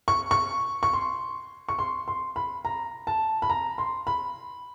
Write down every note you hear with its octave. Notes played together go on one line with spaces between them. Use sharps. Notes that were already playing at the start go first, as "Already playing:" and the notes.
C#6
C#6
C#6
C6
C#6
C6
C6
B5
A#5
A5
B5
A#5
C6
B5